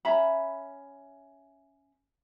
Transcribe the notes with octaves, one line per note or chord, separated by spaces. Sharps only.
C#4 E5 A#5 B5